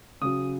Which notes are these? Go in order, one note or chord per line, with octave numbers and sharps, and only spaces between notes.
C#3 F#3 D#6